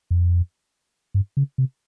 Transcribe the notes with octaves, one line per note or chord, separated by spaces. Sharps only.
F2
G2
C#3
C3